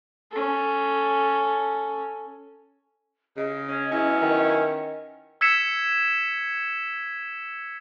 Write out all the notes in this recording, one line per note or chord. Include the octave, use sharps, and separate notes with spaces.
C#4 A4
C#3 D#5
C#4
F#3 B3 C#4 E4
D#3
E6 G#6 B6 C#7 E7